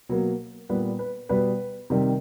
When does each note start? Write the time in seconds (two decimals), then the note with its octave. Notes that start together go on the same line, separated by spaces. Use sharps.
0.09 B2 F#3 A#3
0.69 A#2 G3 B3 B4
0.99 B4
1.29 B2 G3 B3 B4
1.90 C3 D#3 G3